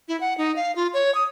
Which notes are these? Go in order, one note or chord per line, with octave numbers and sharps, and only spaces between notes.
E4
F#5
D#4
F5
F4
C#5
D#6